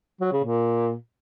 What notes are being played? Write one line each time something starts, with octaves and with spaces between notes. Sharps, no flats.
F#3
C#3
A#2